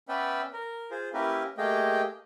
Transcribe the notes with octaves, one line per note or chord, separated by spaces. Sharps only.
B3 C#4 B4 D5 E5 G5
A#4
F4 G#4 C5
A#3 C#4 E4 G4 A#4 B4
A3 A#3 G4 G#4 D#5 G5